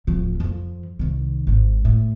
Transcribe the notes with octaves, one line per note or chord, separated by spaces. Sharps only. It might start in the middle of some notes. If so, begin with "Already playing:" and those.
D1 F3
F2 F3
C2 D#3
G#1 G#2
A2